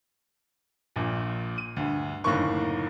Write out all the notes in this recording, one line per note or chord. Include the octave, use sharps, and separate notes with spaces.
A#1 A#2
D#7
D2 G2
F#1 A2 D3 D#3 A#3 C#6